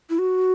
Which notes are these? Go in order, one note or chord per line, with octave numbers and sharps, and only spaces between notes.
E4
F#4